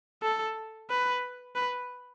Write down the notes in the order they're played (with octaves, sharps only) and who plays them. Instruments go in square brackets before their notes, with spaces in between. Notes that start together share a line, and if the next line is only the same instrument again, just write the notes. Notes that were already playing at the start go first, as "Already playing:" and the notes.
[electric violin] A4
B4
B4